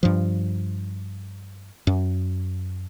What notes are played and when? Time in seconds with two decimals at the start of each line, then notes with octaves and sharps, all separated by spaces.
0.03 G2 F3
1.87 F#2